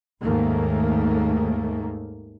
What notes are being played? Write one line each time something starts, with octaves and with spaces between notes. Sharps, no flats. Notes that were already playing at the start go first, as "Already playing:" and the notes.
D#2 G#2 D#3 A3 A#3